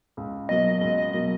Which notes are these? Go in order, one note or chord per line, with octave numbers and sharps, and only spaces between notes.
C#2
B2 F#3 A#3 D#5
C#2 D#5
D#5
B2 F#3 A#3 D#5